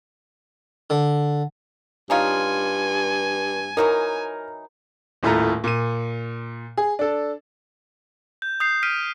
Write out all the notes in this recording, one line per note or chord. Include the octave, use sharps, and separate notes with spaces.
D3
G2 C#4 D#4 F4 G#5
E3 F#3 D#4 A#4
D#1 A2 A3 F4 A4 A#5
A#2 D#7
G#4
D4 A4
G6
D#6 G6 C7
F6 B6 D7 D#7